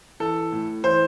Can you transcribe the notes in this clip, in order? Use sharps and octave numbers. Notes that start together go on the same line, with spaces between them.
E3 A4
A2
E3 C5